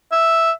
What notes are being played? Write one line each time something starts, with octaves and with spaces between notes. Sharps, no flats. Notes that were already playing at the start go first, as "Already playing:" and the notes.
E5